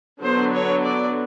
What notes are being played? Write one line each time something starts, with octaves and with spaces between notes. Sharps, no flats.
D3 F#3 B3 C5
C#5
D5